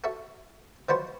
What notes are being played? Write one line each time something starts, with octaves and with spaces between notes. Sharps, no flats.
F#4 A4 E5
D#3 F3 F#3 F#4 B4 C5